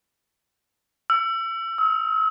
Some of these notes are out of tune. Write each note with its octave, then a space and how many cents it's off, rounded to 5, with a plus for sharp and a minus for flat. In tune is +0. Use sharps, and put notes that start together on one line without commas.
E6 +30
E6 -40